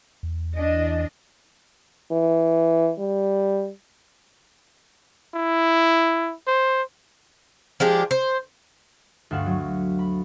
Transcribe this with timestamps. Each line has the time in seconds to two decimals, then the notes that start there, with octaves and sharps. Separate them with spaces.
0.23 E2
0.56 E3 D4 D#5
2.12 E3
2.98 G3
5.34 E4
6.47 C5
7.80 F3 G#3 D4 G4
8.11 C5
9.31 D2 G2 F5 F#5 E7
9.46 F#3
9.99 B5